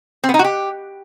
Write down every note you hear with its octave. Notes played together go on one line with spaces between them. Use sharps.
C4
B3
D#4
F#4
G4